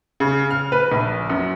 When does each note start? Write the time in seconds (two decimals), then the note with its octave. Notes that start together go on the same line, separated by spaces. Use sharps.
0.20 C#3
0.51 F6
0.72 B4
0.92 A#1
1.30 F#2